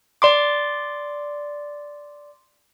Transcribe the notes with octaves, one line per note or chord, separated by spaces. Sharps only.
D5 C6 D6